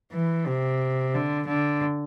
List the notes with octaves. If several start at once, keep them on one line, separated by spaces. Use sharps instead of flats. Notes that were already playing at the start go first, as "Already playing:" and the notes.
E3
C3
D3
D3